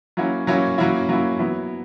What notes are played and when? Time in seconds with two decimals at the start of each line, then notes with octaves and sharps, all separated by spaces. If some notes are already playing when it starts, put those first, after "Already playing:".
0.17 F#3 A#3 C#4 E4
0.47 F#3 A#3 C#4 E4
0.78 F#3 A#3 C#4 E4
1.09 F#3 A#3 C#4 E4
1.39 F#3 B3 E4